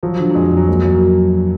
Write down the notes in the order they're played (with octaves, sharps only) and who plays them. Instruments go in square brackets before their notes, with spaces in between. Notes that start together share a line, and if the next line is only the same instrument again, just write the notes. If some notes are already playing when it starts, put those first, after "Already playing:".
[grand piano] F3 [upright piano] F#3
[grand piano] D3
[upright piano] F#3
[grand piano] F2 [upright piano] G#3
[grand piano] F2
[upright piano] F#3
[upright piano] G#3 [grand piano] A#3
[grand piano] F#3
[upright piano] A#3